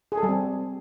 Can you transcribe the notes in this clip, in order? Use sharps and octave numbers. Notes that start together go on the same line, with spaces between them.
G#4
A4
G3
C4